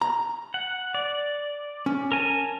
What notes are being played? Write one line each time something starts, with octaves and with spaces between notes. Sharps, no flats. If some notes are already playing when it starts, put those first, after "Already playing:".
A#5
F#5
D5
C#4
A#4 G#5 A5